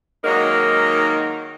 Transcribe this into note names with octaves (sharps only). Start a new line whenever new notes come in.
D#3 F#3 G#3 A#3 D#4